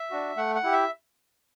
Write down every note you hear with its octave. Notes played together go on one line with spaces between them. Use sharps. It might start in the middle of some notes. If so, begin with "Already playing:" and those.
Already playing: E5
D4 F#4
A3 F#5
F#5
E4 G4
E5